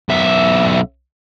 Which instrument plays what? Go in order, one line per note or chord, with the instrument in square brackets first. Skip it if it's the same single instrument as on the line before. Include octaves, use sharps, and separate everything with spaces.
[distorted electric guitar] B1 E5